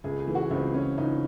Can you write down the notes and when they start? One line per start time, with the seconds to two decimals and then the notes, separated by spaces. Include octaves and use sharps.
0.04 C#2 G#4
0.20 G#4
0.27 E3
0.35 F#4
0.51 C#2 C4
0.74 C#2 C#4
0.98 C#2 D#4